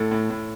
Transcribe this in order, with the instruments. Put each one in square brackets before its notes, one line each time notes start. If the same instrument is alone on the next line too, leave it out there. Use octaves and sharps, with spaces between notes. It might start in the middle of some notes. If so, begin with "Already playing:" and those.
Already playing: [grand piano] A2 A4
A2
A2